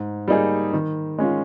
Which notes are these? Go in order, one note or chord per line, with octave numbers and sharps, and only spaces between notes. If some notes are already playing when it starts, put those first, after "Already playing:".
Already playing: G#2
G3 A#3 D#4 G#4
D#3
G#3 C#4 F4